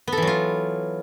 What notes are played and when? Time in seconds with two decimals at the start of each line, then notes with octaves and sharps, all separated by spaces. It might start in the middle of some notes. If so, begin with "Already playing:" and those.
0.08 B3
0.12 A4
0.17 E3
0.22 F#3
0.27 F4